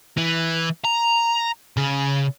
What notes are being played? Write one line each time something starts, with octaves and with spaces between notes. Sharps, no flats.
E3
A#5
C#3